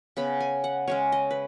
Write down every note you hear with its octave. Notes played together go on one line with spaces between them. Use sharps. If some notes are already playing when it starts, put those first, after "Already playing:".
C#3 B3 B5
G#5
F#5
C#3 G#3 C#4 C#5
D#5
B4